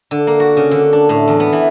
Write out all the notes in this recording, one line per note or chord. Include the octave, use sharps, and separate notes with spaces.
D3
A#3
F#4
C#3
D3
D4
A2
E2
B3
E3